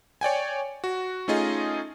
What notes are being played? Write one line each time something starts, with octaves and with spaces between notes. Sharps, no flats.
C#5 D5 G5 G#5
F#4
A3 C#4 D#4 F4 G#4 D#5